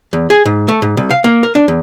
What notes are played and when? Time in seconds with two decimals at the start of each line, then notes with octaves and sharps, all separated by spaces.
0.13 E2
0.30 G#4
0.45 G#2
0.68 A3
0.82 G#2
0.97 C2
1.11 F5
1.24 A#3
1.43 A#4
1.55 D4
1.68 E2